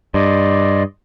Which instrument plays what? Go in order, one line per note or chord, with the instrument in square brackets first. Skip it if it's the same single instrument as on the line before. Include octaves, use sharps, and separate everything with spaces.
[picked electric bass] G2 [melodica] D5 D#5 C6